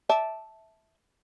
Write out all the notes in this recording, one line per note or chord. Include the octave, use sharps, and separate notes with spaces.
D5 E5 A5